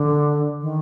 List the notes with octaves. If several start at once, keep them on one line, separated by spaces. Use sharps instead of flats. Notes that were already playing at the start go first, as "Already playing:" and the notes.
Already playing: D3
D#3